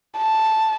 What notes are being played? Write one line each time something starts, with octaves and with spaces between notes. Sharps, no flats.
A5